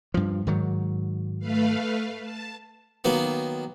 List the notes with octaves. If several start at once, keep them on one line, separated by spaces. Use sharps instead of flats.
G2 F3
G#2 D#3 F#3
A3 B4 F5
A5
D#3 F#3 A#3 B3